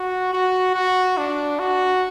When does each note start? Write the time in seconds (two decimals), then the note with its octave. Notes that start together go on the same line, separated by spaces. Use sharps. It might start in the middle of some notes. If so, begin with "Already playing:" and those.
Already playing: F#4
0.33 F#4
0.75 F#4
1.18 D4
1.59 F#4